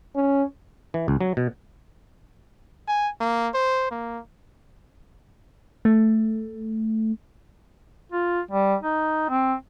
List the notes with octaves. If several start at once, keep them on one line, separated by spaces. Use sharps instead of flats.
C#4
E3
C#2
F#3
B2
G#5
A#3
C5
A#3
A3
F4
G3
D#4
C4